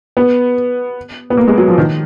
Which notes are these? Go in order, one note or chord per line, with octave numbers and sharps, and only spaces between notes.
B3
B3
A#3
G#3
F#3
F3
D#3